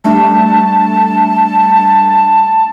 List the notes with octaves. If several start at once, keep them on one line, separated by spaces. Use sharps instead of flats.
G3 A3 D4 A5